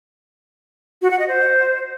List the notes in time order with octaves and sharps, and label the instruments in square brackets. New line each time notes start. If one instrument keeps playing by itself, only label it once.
[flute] F#4
F#5
D#5
C5